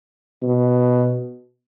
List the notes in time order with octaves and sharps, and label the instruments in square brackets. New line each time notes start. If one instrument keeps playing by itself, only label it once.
[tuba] B2